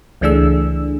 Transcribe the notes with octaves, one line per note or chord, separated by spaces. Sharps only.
C#2 E3 A3 D4 G#4 E6